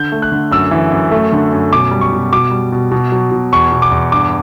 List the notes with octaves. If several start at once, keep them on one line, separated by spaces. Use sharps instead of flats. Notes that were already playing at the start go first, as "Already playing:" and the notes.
Already playing: D3 G6
A3
F#6
D3
F#2 E6
E3
F#2
A3
D3
F#2
B2 D6
G3
C#6
B2
B2 D6
G3
B2
B2
F#3
B2
E2 C#6
B2
D6
E2
G2 D6